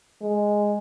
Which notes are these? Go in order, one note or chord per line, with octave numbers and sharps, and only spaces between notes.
G#3